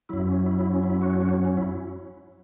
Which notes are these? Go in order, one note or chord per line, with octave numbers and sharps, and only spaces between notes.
F#2 F#3 E4
C#4
E4
E4
C#4
E4
C#4 F#4
C#4 F#4
C#4
C#4
E4